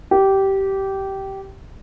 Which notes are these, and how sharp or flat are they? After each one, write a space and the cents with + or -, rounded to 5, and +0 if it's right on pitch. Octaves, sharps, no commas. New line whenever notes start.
G4 -15